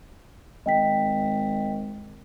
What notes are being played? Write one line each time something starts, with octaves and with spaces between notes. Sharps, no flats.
G#1 D#5 G5 B6